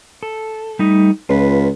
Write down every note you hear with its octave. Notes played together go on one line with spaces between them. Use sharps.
A4
G3 A3 D#4
C#2 F4 B4